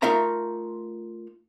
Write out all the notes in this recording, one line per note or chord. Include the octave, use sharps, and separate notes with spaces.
A3 D#4 F4 A#4 E5 A#5